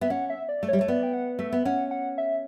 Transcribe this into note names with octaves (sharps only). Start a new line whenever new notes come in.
B3 E5
C#4 F#5
E5
D5
A3
C#5
G3
A3 C#5
B3 D5
G5
F#5
A3 E5
B3
C#4 F#5
F#5
E5